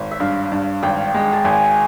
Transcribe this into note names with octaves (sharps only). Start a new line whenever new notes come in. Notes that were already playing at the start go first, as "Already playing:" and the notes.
Already playing: G#1 C#5
E5
G2 F5
G2
G#1 G5
G#3
A5
G#1 G#5